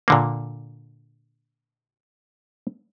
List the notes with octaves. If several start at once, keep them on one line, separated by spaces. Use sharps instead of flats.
A#2 D3 A#3